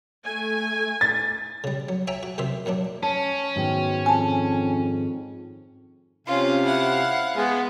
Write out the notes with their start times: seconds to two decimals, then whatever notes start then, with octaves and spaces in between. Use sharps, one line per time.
0.24 A3 G#5
1.01 A6
1.64 C#3 G3
1.89 F#3
2.07 C#5 E5 G5 G#5 A#5
2.23 F#4
2.38 F#2 C3 D#3 C5 E5
2.66 D#2 D#3 F#3 D4
3.03 C#4 C#5 A5
3.56 G#2 B2 D#3 G#3
4.06 F2 G#5 A5
6.27 C3 C#4 F4 F5
6.65 E4 F#5
7.36 G#3 B3